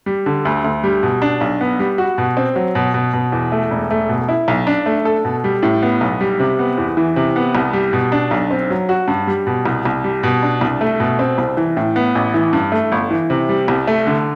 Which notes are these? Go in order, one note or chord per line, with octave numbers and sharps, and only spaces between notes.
G3
D3
D2
D2
G3
B2
D4
B1
B3
G3
F#4
B2
C4
F#3
B2
B2
B2
E2
A3
E1
A3
B2
E4
B1
D4
A3
A4
B2
G3
A2
B3
B1
G3
C3
B3
E2
E3
C3
B3
C2
G3
B2
D4
B1
C4
F#3
F#4
G2
G3
B2
C2
C2
G3
B2
D4
C2
A3
B2
C4
C2
E3
A2
B3
A1
E3
G2
A3
G1
E3
C3
G3
C2
A3
D3